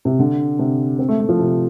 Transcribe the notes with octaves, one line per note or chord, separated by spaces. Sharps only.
C3
D3
C3
C4
A3
A3
F3
C3